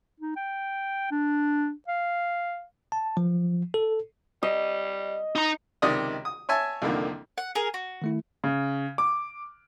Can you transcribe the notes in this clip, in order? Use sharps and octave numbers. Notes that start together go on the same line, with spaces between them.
D#4
G5
D4
F5
A5
F3
A4
G3 D#5
D#4 A#5
C#2 C3 D#3 D5 D#5 D#6
D#6
C#5 E5 G#5 A5
C2 F2 D3 D#3 A#3
F#5
G#4 A#4
F#4
D#3 A3 E4
C#3
D6